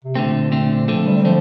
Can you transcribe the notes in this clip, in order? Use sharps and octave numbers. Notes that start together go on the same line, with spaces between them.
C3
A#2 D3 A3 C4
D3 A3 C4
D3 F3 A3 C4
G3
G3
D3 F3 A3